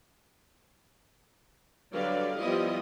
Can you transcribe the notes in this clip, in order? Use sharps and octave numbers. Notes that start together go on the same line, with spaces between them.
D3 F#3 G3 B4 D5 F5
F3 G3 B3 E4 D#5